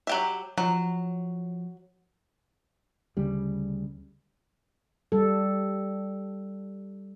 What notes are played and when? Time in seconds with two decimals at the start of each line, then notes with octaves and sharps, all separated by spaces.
0.07 F#3 G4 E5
0.58 F3 F#3
3.17 D2 C#3 G3
5.12 G3 A4